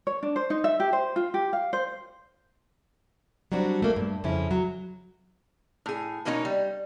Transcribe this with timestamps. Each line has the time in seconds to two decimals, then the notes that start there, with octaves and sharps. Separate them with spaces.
0.07 C#5
0.23 D4
0.36 C5
0.50 D#4
0.64 E5
0.80 G4
0.93 C5
1.16 F4
1.34 G4
1.53 F5
1.73 C5
3.52 F#3 G3 C4 D4 F#4
3.82 A3 A#3
3.96 G2
4.24 F2 C#3 C#4 E4
4.51 F#3
5.86 A2 G#4
6.25 B2 A#3 C#4 D#4 F4 C#5
6.45 G3